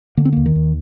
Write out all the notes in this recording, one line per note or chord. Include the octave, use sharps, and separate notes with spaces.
D3 A#3
C4
D#2 A#3
D#3
D#2